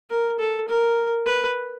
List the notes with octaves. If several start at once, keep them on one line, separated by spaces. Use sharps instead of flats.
A#4
A4
A#4
B4